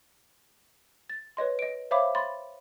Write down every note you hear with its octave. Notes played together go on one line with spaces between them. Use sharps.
A6
B4 C#5 D#5 C6
D#5 D7
C5 C#5 E5 F5 B5 D6
B5 C6 A6